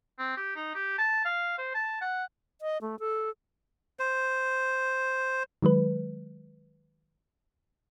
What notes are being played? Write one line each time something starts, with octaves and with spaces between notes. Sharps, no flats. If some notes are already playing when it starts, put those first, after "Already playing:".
C4
G4
D#4
G4
A5
F5
C5
A5
F#5
D#5
A3
A4
C5
D#3 F#3 G#3 B4